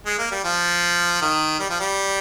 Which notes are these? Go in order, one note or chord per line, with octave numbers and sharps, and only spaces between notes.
G#3
A#3
G3
F3
D#3
G3
F3
G3